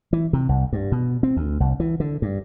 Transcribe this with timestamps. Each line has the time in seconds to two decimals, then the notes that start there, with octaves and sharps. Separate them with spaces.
0.13 E3
0.33 C3
0.49 C2
0.73 G2
0.92 B2
1.23 C4
1.37 D2
1.60 C2
1.80 E3
2.00 D3
2.22 G2